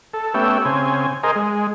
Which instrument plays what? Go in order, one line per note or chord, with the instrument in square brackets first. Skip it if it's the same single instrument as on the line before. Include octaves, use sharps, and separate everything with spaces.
[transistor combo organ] A4
A3 B3 C#4 G4 E5
C#3 C4 G#5
G#4 A#4 C5 D#5
G#3